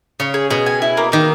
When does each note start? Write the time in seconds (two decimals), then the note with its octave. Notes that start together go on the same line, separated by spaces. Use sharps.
0.20 C#3 C#5
0.34 G#4
0.50 B2 G#4
0.66 G#5
0.82 E4
0.97 A#3
1.12 D#3 A#3